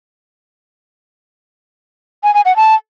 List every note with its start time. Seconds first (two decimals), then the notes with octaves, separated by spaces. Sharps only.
2.23 G#5
2.34 G#5
2.45 F#5
2.56 A5